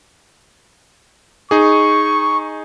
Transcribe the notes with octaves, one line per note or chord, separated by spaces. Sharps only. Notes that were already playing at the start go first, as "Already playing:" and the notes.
D#4 G#4 C#6